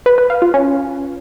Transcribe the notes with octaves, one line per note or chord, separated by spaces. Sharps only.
B4
B4
F5
F4
C#4